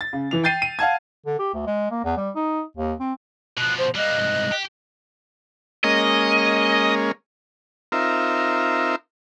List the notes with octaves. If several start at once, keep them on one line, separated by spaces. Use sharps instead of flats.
A6
C#3
E3 F7
G5 G6 A6 C7 D#7
D#7
F5 F#5 A5 G#6
D3
G4
D2
G#3
A#3
E2
G3
D#4
D#2
C4
B2 F3 F#6
C5
G3 A#3 D#5 F#6
C2 G#2
G4
G#3 A#3 C#4 D#5
C4 D#4 F4 A#4 E5